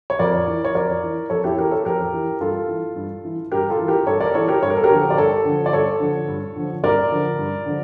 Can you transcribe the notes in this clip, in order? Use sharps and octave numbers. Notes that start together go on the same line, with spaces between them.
C#5
F2 A#4 D5
E3
C#5
F2 A#4 D5
E3
F2 A4 C#5
E4 G4
E3 G4 A#4
A4 C#5
F2 G4 A#4
E3
G2 F4 A4
E3
G2
E3
G2 G4 A#4
F4 A4
E3
G4 A#4
G2 A4 C#5
A#4 D5
E3 A4 C#5
G4 A#4
G2 C#5
A#4
A4
G4 A#4
D3 F3
D5
G2 A4 C#5
D3 F3
D5
G2 A4 C#5
D3 F3
G2
D3 F3
G2 A#4 D5
D3 F3
G2
D3 F3